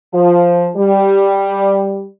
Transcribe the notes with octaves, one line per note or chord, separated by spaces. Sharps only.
F3
G3